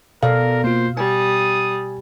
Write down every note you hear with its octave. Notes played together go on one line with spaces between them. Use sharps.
B2 A4 A#4 D5 F5
A#3 F4 C5
G3 G#5 D#6